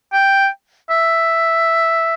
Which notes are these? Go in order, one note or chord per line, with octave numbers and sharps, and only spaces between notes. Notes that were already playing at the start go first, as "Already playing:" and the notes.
G5
E5